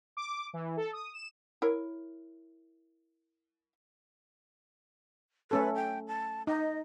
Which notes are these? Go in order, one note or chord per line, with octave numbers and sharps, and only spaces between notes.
D6
E3
A4
D#6
E7
E4 A#4 C#5
A3 C#4 A4 B4
G5
A5
D#4 D#5